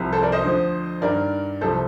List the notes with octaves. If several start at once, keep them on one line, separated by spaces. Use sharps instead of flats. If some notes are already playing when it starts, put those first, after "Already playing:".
Already playing: C2 C3 F3
A4 C5
A#4 D5
C5 D#5
D2 D3 F3
G2 D#3 A#4 D5
C2 C3 F3 A4 C5